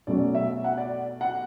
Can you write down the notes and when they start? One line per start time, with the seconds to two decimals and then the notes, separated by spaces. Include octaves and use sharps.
0.07 B2 F#3 A3 C#4 D5
0.35 E5
0.64 F#5
0.78 D5
1.21 F#5